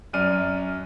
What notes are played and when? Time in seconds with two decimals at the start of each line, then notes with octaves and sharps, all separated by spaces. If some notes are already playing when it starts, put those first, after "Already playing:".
0.13 F#2 D5 F6 D#7